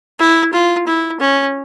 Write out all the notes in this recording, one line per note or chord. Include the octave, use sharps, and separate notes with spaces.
E4
F4
E4
C#4